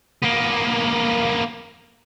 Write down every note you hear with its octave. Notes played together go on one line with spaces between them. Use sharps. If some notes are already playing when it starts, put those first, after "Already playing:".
A#3 B3